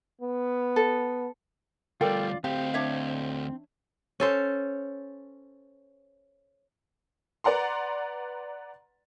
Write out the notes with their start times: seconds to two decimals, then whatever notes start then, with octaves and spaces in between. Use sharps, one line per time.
0.21 B3
0.76 A4
2.01 D2 G3 F4 A4 A#4 D5 G5
2.44 D2 C4 G4 F5
2.74 D4 C#5 E5
4.20 C#4 A4 C5
7.44 B4 D5 F#5 A#5 C6